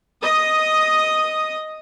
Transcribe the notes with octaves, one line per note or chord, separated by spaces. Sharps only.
D#5 D#6